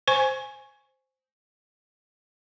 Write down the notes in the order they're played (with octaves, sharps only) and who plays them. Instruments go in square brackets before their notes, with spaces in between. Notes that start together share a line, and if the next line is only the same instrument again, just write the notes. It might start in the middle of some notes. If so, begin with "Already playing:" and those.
[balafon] C5 G#5 C#6